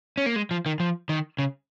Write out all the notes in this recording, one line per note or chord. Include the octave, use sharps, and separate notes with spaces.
C#4
A#3
G#3
F3
D#3
F3
D#3
C#3